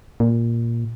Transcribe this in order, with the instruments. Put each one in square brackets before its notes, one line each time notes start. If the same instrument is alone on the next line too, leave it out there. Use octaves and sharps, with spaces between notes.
[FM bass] A#2